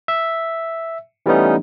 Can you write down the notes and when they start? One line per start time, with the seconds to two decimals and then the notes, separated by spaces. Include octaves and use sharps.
0.08 E5
1.26 E3 G3 A3 B3 C#4 D#4